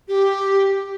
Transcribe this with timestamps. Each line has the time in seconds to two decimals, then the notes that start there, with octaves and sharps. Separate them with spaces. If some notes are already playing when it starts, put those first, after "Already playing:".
0.08 G4